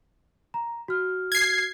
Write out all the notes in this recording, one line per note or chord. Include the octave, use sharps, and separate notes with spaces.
A#5
F#4 F6
G#6 C7